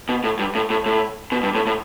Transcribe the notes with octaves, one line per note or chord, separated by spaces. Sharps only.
B2
A2
G2
A2
A2
A2
B2
G2
A2
A2